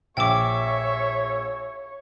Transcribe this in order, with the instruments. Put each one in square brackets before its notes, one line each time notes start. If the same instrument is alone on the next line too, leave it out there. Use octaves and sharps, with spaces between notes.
[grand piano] A#1 [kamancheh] C#5 [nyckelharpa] E5 [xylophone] G5 D6